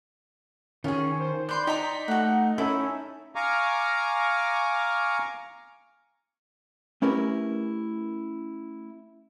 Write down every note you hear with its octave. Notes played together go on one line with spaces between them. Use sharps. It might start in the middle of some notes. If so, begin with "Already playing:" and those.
D#3 C#4 F4 G#4 C#5
C5
B4 D5 C6 G6
D#4 G5 A#5 C6 B6
A3 F#4 F#5
C#4 E4 A4 E5 G#5
F5 G#5 A#5 C#6 D6
A3 C#4 E4 G4 A#4 B4